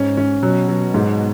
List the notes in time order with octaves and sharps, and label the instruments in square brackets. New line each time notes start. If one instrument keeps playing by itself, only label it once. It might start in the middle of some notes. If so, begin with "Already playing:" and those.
Already playing: [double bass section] G#2 [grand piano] C#4
[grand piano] C#4
[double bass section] B2 [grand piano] F#3
[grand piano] F#3
G#2